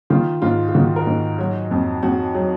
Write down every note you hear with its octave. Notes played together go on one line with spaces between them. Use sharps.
D#3 F4
G#2 F4
F4
D#3 F#4
A#4
G#2
F#3 F#4
F2
F2 F#4
F#3